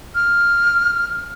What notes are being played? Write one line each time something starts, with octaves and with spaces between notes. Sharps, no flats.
F6